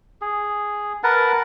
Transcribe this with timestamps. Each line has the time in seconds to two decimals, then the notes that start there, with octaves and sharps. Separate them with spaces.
0.21 G#4
1.03 A#4 B4 F#5 A5